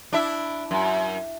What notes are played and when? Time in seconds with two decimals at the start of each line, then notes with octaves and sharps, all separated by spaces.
0.13 D4 E4 E5
0.71 F#2